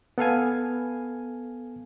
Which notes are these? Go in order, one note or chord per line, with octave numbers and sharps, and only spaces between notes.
B3 A4 F5 G#5